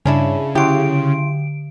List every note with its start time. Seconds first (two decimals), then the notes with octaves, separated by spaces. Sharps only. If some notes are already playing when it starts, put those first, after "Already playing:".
0.05 G2 C#3 C#4 D4 E4
0.55 D3 F#3 E4 G4 C6 D7